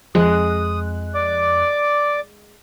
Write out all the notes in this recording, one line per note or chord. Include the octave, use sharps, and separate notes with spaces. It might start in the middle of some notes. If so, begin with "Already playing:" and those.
F2 G#3 D#6 F#6
D5 D6